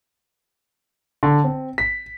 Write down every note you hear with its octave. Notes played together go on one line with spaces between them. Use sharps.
D3
C4
B6